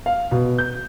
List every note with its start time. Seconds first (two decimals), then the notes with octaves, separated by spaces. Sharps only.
0.06 F5
0.31 B2
0.58 G6